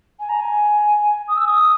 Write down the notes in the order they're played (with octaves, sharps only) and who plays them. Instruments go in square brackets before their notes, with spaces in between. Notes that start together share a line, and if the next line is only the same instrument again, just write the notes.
[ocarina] G#5
A#5
G#5
D#6
E6
D#6